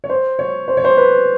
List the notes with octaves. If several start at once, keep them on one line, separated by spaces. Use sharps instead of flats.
C#5
C5
C#5
C5
C#5
C5
B4